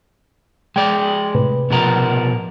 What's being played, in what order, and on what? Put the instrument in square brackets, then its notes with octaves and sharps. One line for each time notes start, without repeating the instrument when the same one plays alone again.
[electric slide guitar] G#3 D5 [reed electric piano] G5
[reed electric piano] A2 C3 B4
[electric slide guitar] B2 F3 A#4